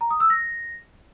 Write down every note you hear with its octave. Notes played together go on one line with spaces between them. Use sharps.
A#5
D#6
E6
A#6